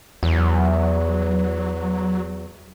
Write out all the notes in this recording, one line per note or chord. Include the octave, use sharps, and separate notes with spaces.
E2 F#3